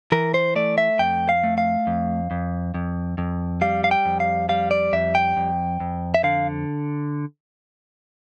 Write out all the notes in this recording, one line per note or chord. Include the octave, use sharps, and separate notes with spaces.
E3 A#4
C5
A3 D5
E5
F2 G5
F5
A3
F5
F2
F2
F2
F2
G3 F5
F5
G5
F2
F5
G3 F5
D5
F2 E5
G5
F2
F2
E5
D3 F5